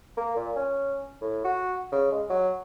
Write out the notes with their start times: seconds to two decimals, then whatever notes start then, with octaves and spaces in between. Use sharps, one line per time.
0.17 A#3
0.36 A#2
0.56 C#4
1.22 A2
1.45 F#4
1.92 C#3
2.12 G#3
2.30 F#3